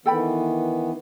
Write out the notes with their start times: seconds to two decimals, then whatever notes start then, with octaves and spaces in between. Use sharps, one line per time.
0.06 D#3 E3 B3 A4 G5 B5